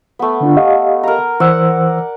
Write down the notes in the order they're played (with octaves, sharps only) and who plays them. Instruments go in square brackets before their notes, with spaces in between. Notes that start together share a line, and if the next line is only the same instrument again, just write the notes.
[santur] A3 B3
[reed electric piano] D3 D4 F4
G4 D#5 F5
[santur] A#4 A#5
[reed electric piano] E3 C5 E6 [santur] D5 F#5